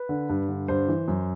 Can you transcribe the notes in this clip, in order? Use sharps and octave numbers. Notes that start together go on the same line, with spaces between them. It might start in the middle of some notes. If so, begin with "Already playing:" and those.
Already playing: B4
D3
G2
D3
G2 C5
E3
F#2